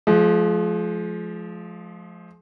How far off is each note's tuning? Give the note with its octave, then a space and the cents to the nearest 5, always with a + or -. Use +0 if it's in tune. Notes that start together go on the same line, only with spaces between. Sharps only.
F3 +0 G#3 +40